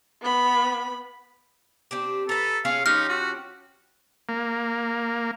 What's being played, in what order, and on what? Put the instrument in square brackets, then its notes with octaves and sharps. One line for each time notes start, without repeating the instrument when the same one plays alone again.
[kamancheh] B3 B5
[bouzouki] C4 D4 G4
[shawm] A4 [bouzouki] B4 A#5
[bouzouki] C#4 F4 G#4 [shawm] F5
[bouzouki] F3 C#4 G4 [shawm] D#4 [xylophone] F6
[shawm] F#4
[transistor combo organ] A#3